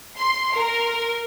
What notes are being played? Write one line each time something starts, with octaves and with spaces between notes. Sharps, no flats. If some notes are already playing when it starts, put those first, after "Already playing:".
C6
A#4